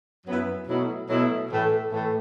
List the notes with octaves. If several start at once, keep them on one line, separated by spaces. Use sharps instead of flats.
F#2 F#3 B3 E4
B2 F#3 A3 E4
B2 F#3 A3 E4
A2 E3 A3
A2 E3 A3